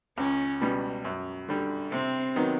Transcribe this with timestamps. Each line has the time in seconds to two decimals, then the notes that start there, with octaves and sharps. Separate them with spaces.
0.18 C#2 C#4
0.62 B2 G3
1.05 F#2
1.49 D3 G3
1.92 C3 C4
2.36 D#3 F#3 B3